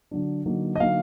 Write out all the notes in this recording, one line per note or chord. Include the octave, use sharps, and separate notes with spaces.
D3 F#3 D4
D3 F#3 A#3 D#4
D#5
D3 F#3 A#3 D#4 F5